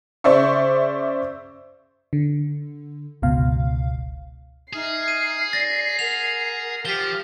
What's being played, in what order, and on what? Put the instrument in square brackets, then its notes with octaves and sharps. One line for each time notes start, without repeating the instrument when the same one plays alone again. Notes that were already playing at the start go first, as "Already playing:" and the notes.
[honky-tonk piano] C#3 C5 D5 E5 C#6
[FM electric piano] D3
G1 C#2 B2 F5
[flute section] D#4 E5 F6 [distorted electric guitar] G#4 [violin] C7
[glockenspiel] D#7
[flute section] D5 [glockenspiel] A6 A#6
[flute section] A#4 F#5 [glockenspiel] F7
[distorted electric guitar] F3 [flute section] G4 F6 [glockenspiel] B6 G7